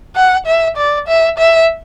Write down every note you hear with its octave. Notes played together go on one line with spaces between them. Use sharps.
F#5
E5
D5
E5
E5